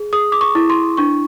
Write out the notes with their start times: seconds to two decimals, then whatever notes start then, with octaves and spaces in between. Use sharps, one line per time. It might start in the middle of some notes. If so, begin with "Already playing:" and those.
Already playing: G#4
0.13 G#4 D#6
0.32 D6
0.41 C#6
0.55 E4
0.70 C6
0.97 D4 C#6